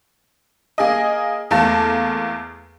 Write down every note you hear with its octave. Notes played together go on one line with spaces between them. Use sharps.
A#3 G#4 D#5
E2 A3 A#3 A4